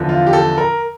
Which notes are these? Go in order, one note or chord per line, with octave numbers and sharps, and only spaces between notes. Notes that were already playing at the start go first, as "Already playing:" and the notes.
Already playing: E2 D3 F3
F4
G4
A4
A#4